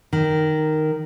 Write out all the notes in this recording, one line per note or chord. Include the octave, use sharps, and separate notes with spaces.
D#3